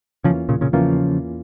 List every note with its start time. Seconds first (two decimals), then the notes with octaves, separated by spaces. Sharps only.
0.24 E2 C#3 E3 F3 A#3 C#4 F4
0.49 A#2 C#3
0.61 A#2 C#3
0.73 E2 C#3 E3 F3 A#3 C#4 F4